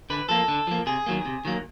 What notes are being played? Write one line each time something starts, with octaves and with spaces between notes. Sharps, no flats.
D3 B4
F3 A#3 A4
D3
F3 A#3
C3 G#4
D#3 F#3 A#3
C3
D#3 F#3 A#3